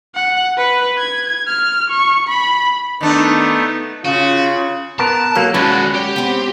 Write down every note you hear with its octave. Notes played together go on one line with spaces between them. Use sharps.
F#5
B4
G#6
F6
C#6
B5
D#3 A3 B3 D4 D#4
C#3 F4 F#4
B3 A#4 A5 A#5
F#3 A#3 A4
F#3 G#3 C#4 F#4 B4 D5
G4
B3 C4